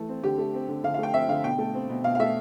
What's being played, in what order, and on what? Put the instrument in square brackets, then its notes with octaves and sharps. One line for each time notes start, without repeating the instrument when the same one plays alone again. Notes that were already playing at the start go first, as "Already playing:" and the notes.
Already playing: [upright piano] E3 A3
C4
D3 G4
A3
C4
D3
D3 F5
F5
A3 G5
C4 E5
D3 F5
B2 G5
A3
C4
B2
B2 F5
F5
A3 E5